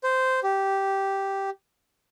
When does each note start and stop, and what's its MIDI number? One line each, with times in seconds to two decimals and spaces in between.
0.04 0.40 72
0.43 1.50 67